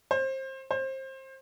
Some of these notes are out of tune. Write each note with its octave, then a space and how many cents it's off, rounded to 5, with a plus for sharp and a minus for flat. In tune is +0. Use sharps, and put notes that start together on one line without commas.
C5 +25
C5 +25